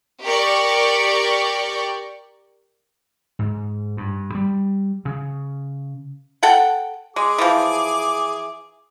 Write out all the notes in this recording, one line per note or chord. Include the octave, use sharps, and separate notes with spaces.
G4 A#4 D5 C#6
G#2
G2
G3
C#3
A4 F#5 G5
G#3 G#4 D6
E3 F3